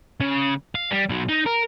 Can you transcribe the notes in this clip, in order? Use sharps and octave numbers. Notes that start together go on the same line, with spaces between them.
C#3
F5
G3
B2 F#3
D#4
A#4